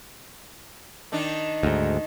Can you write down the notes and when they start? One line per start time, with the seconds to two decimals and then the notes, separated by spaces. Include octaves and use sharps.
1.12 D#3 D4 D#4
1.63 D2 G#2